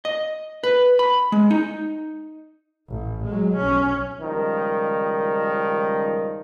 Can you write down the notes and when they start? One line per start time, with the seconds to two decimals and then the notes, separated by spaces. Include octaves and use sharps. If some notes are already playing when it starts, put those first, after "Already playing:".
0.05 D#5
0.64 B4
0.99 B5
1.32 G#3
1.51 D#4
2.89 A1
3.26 F#3 G#3
3.57 B1 C#4
4.21 C#2 D#3 F3 G3